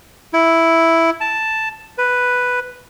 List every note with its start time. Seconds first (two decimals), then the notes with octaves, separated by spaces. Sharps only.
0.33 E4
1.21 A5
1.98 B4